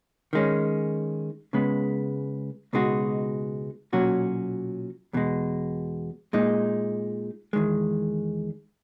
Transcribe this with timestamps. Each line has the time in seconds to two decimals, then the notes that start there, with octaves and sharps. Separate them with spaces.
0.33 D#3 G#3 C#4
1.53 C#2 C#3 G#3 B3
2.73 C#2 B2 G#3 D#4 F#4
3.93 B1 A#2 F#3 C#4 F#4
5.13 E2 B2 G#3
6.33 A#2 G#3 D#4
7.53 E2 D#3 G#3